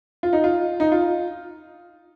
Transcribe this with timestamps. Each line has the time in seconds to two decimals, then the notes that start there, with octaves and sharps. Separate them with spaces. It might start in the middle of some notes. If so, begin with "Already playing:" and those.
0.23 F4
0.33 D#4
0.44 F4
0.80 D#4
0.92 F4